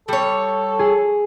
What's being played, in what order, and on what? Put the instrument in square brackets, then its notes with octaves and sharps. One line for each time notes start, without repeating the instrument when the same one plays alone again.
[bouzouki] G3 C#5 [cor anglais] A4
[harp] G#4